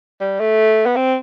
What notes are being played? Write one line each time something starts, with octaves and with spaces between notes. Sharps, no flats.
G3
A3
B3
C4